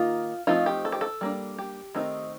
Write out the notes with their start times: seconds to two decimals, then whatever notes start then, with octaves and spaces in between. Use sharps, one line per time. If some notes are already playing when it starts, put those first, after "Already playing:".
Already playing: D#3 A#3 D#4 F4
0.47 F3 A3 C4 D#4 F4
0.66 G4
0.85 A4
0.92 G4
1.01 A4
1.21 G3 A#3 D4
1.58 G4
1.95 D#3 A3 C4 D#4